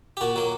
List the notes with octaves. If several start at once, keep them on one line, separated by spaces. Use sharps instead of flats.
G4
A#2 F#4
F#3 A#3